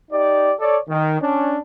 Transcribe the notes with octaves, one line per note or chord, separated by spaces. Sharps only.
D#4 G4 D5
A4 C#5 D5
D#3
C#4 D4